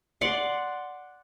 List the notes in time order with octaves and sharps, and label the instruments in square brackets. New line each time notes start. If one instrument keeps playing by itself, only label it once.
[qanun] D5 F#5 C6 D6